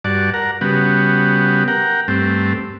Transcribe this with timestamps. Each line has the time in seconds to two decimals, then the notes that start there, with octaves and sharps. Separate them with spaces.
0.04 G2 F#4 D5 A5
0.34 A#4 F#5
0.61 C#3 G3 B3 F#4
1.68 A#4 F#5 G5
2.08 G2 A3 C4